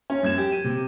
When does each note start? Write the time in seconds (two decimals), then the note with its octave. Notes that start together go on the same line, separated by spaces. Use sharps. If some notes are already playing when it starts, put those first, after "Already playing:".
0.10 C#4
0.23 F#2 G#6 E7
0.38 G4
0.52 D#7
0.64 C3